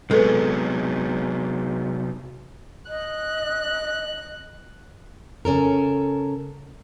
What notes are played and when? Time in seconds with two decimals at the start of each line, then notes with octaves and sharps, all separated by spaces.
0.11 C3 F#3 G#3 B3 A4 B4
2.88 D#5 F#6
5.45 C#3 C#4 A4 A#4